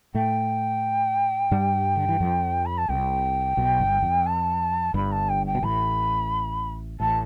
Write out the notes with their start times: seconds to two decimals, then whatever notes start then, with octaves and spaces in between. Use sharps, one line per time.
0.14 A2 A3 G5
1.51 G2 G3
1.96 D3
2.09 E3
2.20 F2 F3
2.65 B5
2.77 A5
2.88 C2 C3 G5
3.57 B1 B2
3.80 G1 G2
4.03 F2
4.26 A5
4.94 G1 G2 B5
5.11 A5
5.29 G5
5.46 G5
5.55 B2
5.63 A1 A2 B5
7.00 A1 A2 A5